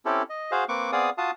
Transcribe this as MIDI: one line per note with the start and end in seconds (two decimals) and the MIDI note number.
0.05 0.22 60
0.05 0.22 61
0.05 0.22 64
0.05 0.22 67
0.05 0.22 69
0.30 0.51 75
0.52 0.64 66
0.52 0.64 68
0.52 0.64 72
0.52 0.64 77
0.69 0.91 58
0.69 0.91 60
0.69 0.91 71
0.69 0.91 85
0.69 0.91 86
0.92 1.10 59
0.92 1.10 60
0.92 1.10 68
0.92 1.10 74
0.92 1.10 77
0.92 1.10 87
1.18 1.31 65
1.18 1.31 66
1.18 1.31 77
1.18 1.31 81
1.18 1.31 87